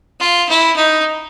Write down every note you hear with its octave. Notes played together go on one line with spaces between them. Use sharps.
F4
E4
D#4